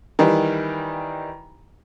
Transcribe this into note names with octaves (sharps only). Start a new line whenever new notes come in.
D#3 E3 G3